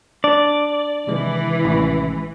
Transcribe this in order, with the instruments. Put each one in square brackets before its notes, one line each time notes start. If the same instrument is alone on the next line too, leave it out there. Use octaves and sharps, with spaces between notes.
[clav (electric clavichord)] D4 [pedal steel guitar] D5
[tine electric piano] C3 D#3 G#3 [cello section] E3
[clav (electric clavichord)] A1